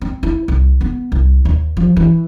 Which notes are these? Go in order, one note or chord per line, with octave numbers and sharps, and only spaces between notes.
C4
E4
C2
B3
C2
D#2
F3
E3